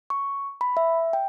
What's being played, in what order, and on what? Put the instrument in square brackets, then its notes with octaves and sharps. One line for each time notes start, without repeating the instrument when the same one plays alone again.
[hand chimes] C#6
B5
E5
G5